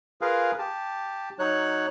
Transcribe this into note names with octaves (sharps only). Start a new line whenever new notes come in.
F4 G#4 A#4 B4 F5
G4 A5
F#3 D#4 C#5 F#6